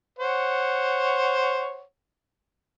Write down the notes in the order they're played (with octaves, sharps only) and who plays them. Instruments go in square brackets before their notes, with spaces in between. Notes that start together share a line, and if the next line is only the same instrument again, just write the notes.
[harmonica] C5 C#5 F#5